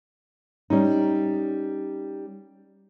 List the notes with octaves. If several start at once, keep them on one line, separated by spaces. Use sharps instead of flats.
G3 C#4 D#4